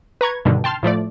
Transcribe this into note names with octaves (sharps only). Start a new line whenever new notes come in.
B4 A#5 C#6 G#6
G2 B2 D3 D#3
G5 A5 C6 F6
A2 F3 A3 D5